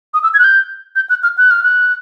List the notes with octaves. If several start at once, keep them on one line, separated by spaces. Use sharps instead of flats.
D#6
E6
G#6
F#6
G6
G6
F#6
F6
F#6
F6
F#6